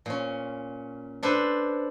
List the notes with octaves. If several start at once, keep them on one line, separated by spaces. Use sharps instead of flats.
A#2 C#4
D4 A4 B4 C5